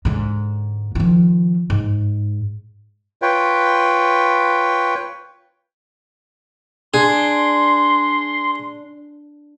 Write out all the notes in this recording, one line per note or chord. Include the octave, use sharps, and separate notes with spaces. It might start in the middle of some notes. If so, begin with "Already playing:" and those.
G#2 D3
D#3 F3
G#2
F4 B4 C#5 G5
D4 G#4 C6